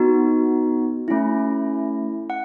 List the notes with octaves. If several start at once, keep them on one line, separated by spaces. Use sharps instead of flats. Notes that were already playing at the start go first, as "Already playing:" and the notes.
Already playing: B3 D#4 F#4
A3 C#4 E4
F#5